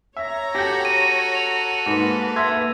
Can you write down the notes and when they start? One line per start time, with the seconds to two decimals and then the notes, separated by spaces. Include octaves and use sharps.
0.17 C#5 E5 A#5
0.55 F#4 G4 A4 G5
0.85 D#7
1.35 F7
1.86 G#2 A#3 B4
2.36 E5 C6 G#6